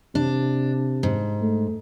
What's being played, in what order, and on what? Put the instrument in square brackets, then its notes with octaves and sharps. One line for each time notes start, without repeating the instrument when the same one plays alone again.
[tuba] C3 [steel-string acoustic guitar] D4
[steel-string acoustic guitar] G#2
[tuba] A3